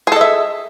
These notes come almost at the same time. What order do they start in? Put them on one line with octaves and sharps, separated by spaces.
G#4 A4 D#5 E5